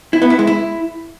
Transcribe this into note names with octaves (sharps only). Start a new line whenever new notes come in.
E4
B3
E4
G#3
E4